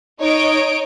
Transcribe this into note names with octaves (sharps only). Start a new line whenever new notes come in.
D#4 C#5 D#5 D7